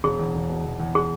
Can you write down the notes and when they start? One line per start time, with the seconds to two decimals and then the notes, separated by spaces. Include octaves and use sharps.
0.04 E1 G#4
0.20 E2
0.35 E1
0.50 B2
0.64 E1
0.80 E2
0.95 G#4